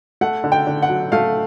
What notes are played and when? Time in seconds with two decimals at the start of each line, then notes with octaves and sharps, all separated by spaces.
0.21 A3 F#5
0.44 D3
0.52 G5
0.67 D3
0.82 F#5
0.89 F#3
1.12 A3 F5